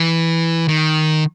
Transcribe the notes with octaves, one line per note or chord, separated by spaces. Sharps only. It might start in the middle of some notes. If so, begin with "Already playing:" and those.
Already playing: E3
D#3